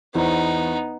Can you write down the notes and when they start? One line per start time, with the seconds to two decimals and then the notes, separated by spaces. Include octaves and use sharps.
0.15 E2 B3 D#4 E4 C5